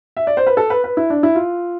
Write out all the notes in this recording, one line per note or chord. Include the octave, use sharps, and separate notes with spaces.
E5
D5
C5
B4
A4
B4
B4
E4
D4
E4
F4